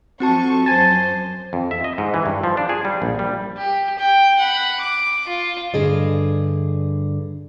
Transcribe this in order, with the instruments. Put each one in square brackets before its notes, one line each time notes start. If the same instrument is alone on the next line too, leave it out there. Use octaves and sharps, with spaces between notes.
[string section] F3 A4 C#6 [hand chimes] C4 F#4 A5
[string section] F#2 C5 [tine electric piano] G#5 A5 [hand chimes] A6
[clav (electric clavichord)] F2
E5
D#5
G#2
E3
G2
F3
D4
G#4
G3
A#1
G3
[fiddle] G4
G5
F#5 B5
D6
F4
[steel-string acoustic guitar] G2 D3 G#4 D#5